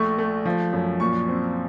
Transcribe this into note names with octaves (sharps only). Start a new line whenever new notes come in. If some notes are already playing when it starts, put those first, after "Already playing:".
Already playing: A#1 A3 C#6
A3
F3
F#2
A#2 C#6
C4